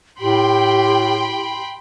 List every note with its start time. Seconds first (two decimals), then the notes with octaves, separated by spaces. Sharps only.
0.20 A2 G4 G5 B5 C6